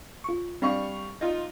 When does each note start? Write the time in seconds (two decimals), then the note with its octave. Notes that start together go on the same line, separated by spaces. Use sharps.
0.24 F4 C#6
0.62 G3 C4 D4 F5 C#6
1.21 D#4 F4